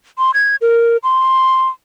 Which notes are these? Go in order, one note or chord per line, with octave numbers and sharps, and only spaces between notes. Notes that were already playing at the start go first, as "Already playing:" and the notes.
C6
G#6
A#4
C6